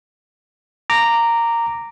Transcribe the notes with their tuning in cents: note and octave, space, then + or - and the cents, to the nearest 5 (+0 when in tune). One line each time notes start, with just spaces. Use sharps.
A#5 -10 D6 +0